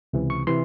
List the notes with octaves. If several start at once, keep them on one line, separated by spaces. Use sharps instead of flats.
C#2 C3 E3
C#6
C3 E3 C6